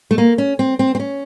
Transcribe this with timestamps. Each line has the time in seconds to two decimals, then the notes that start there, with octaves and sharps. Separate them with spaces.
0.11 A3
0.18 A#3
0.38 C#4
0.59 C4
0.79 C4
0.95 C4
1.00 C#4